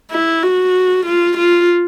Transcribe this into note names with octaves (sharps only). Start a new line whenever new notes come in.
E4
F#4
F4
F4